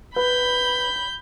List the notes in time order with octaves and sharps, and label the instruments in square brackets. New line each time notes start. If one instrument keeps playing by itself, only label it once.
[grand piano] B4 [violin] B5 G6